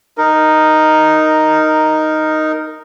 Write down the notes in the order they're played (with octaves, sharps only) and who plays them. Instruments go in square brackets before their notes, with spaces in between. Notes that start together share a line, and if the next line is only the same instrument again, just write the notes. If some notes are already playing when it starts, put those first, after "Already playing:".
[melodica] D#4 A#4